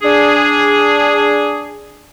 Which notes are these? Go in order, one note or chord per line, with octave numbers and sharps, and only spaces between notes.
D4 G#4